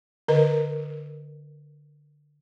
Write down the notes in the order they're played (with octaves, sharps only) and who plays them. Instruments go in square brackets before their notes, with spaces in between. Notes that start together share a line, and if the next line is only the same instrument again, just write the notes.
[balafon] D3 A#4 B4 D#5